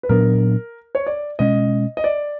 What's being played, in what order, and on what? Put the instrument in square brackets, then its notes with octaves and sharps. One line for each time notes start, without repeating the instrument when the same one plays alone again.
[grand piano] B4
[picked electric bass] A#2 F#3 B3 D4 [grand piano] A#4
[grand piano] C#5
D5
[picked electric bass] B2 G#3 C#4 [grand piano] D#5
[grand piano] D#5
D5